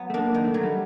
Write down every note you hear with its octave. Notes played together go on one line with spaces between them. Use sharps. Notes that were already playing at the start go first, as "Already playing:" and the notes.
Already playing: F#3 B3
A3
A#3 D4
D#3
A3
F#3
G3